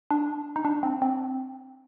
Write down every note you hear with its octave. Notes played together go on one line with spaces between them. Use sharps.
D4
D#4
D4
C4
C4